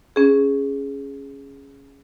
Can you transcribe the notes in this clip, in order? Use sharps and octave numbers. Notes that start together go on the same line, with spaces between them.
C#4 G#4